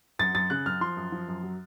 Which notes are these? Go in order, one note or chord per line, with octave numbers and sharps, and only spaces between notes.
F#2 A6
F#2 A6
C#3 F#6
F#2 F6
F3 C6
F#2
F3
F#2
F#3